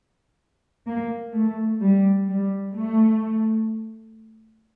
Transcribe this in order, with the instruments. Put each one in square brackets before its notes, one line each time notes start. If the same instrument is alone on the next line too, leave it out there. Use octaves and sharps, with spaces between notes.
[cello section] A#3
A3
G3
G3
A3